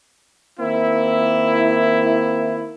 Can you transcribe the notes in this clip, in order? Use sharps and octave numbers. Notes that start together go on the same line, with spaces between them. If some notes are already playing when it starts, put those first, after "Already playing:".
D#3 A#3 C4 E4